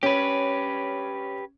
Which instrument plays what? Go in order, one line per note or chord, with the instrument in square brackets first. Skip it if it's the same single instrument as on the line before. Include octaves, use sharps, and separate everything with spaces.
[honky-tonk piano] C#4 [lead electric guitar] G4 B4